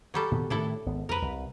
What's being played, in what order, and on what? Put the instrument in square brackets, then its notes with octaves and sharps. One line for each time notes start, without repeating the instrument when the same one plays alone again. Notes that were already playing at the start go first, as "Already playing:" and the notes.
[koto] F#3 G3 A4
[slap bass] A#2 D#3 B3
[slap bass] A2 D#3 [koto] D4 E4 A4
[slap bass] G#1 B3
[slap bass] F2 [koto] A#4 B4
[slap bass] C2